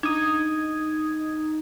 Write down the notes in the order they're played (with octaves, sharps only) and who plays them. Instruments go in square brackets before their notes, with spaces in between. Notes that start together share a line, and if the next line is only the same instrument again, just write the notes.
[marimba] D4 [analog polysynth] D#4 [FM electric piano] D#6 G#6